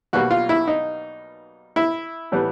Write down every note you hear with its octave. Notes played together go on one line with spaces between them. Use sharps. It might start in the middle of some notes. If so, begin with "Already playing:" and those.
B1 B2 G3 A#3 F#4
F4
E4
D#4
E4
A2 E3 G3 B3